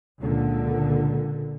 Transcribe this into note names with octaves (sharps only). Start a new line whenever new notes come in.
C#2 A#2 D3